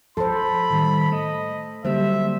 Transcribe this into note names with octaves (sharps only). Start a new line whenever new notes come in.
F3 A4 C5 A5 B5 C6
A2 D#3 G3
A3 D#5
D3 F#3 G3 A#3 G4 C5 E5